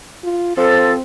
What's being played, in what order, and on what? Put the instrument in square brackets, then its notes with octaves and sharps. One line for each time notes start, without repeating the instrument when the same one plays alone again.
[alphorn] F4
[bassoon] F3 [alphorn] C4 [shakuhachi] A4